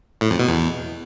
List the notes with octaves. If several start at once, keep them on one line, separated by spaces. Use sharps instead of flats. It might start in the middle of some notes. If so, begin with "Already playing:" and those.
A2
F2
B2
E2